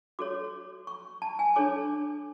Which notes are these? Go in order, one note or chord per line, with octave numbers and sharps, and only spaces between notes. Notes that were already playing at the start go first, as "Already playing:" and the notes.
F#4 A4 C#5 D6
C#6
A5
G#5
D4 A4 C#5 D6